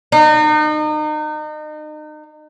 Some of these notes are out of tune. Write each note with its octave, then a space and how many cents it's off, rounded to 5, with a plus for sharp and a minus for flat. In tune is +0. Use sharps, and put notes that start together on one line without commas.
D#4 -35